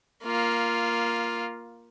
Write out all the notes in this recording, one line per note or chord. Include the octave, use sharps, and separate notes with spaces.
A#3 F4